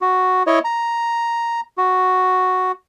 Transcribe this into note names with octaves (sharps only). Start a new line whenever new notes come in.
F#4
E4 C#5 D#5
A#5
F#4